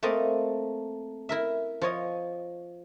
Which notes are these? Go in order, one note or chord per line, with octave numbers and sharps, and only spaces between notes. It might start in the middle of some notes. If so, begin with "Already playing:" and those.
A3 A#3 C4 D#5
E4 A#4 E5
F3 C#5 D#5